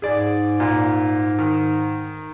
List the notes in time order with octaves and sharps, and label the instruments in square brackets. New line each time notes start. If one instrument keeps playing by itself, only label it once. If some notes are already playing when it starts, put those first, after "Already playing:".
[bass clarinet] G#2 [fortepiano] G#4 D5
[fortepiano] A#2
D#3